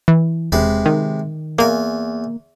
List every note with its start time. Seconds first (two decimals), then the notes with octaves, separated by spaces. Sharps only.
0.08 E3
0.52 E1 C3 G#3 B4
0.86 D#3
1.59 E2 A#3 G#5